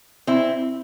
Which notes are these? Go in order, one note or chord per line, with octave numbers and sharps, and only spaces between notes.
C4 E4